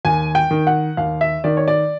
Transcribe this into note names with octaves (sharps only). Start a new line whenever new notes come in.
D#2 G#5
G5
D#3
F#5
D#2 F5
E5
D#3 D5
C#5
D5